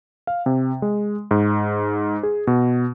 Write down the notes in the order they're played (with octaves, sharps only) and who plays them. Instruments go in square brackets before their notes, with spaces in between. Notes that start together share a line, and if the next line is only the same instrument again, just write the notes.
[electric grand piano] F5
C3
G#3
G#2
G#4
B2